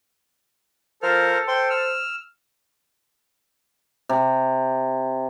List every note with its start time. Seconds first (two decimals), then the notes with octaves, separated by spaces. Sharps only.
1.03 F3 A4 A#4 C5 F6
1.48 C5 G5 C6
1.70 E6 F6
4.09 C3